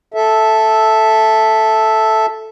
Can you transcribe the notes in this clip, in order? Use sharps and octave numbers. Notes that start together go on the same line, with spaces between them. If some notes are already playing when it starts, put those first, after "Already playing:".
A4 E5